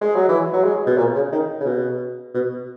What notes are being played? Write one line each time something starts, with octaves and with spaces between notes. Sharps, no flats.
G#3
F#3
E3
F#3
G#3
B2
A#2
C#3
D#3
C#3
B2
B2